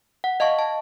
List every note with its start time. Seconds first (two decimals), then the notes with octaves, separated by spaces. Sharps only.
0.24 F#5
0.40 D#5 F5 A5 C#6
0.59 A5